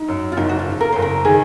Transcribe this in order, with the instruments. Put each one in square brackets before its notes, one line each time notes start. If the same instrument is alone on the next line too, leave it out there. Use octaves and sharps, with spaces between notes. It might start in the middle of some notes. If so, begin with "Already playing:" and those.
Already playing: [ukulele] D#4
[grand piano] F#2
[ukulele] F4
[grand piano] F#1 [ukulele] D#4
[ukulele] F#4
F4
[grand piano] C#3
[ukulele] A#4
[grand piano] F#1 [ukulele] C5
[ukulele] A#4
[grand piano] D#3 [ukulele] G#4